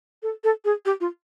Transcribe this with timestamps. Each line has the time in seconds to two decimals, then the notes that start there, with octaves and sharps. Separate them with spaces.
0.23 A4
0.44 A4
0.65 G#4
0.86 G4
1.01 F4